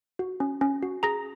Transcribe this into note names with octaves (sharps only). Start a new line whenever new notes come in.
F#4
C#4
C#4
F#4
G#4 A#5 A#6